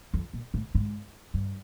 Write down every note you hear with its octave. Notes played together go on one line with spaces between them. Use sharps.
F2
A#2
A2
G#2
G2